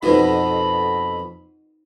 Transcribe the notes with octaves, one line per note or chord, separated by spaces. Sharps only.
F2 B2 D#4 F#4 A4 B4 D#5 B5